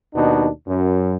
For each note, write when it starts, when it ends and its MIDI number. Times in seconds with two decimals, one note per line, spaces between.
0.15 0.48 39
0.15 0.48 47
0.15 0.48 62
0.15 0.48 63
0.67 1.17 42